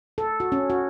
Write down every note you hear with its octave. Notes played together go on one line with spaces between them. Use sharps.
A4
F#4
C#4
F#4